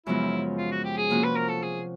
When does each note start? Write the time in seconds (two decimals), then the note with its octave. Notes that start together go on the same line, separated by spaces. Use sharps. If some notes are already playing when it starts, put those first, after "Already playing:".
0.06 F#2 C#3 F3 G#3 B3 E4
0.58 F4
0.71 F#4
0.84 G4
0.97 G#4
1.10 C3 F3 A#3 C#4 F#4
1.23 B4
1.36 A#4
1.49 A4
1.62 G#4